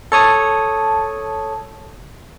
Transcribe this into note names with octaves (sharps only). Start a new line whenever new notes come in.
A4 C#5 A5 D#6